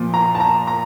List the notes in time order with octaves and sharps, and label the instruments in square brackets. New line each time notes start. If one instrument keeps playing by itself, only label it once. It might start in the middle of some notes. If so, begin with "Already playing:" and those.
Already playing: [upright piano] A#2 F3 A#3
A#5
A5
A#5
A#5